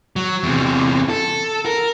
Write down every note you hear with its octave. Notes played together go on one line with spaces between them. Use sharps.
F#3
E2 C3
A4
A#4